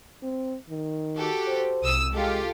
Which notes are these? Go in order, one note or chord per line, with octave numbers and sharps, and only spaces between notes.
C4
D#3
F#4 G4 A4
C5
C2 D#6 E6
G#3 F4 G4 A4